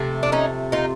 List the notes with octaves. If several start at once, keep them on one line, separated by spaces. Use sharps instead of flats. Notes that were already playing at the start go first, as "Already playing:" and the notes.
Already playing: C3 F3 A3
D4
C#4 D#4
D#4 F4